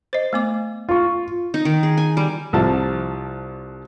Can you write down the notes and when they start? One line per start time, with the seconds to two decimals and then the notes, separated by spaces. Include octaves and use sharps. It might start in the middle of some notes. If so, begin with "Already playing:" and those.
0.13 C5 D#5
0.33 A3 B3 D6
0.89 F4 C#6
1.54 D#4
1.65 D#3
1.83 G#4
1.98 G#5
2.17 G3
2.53 C2 F3 A5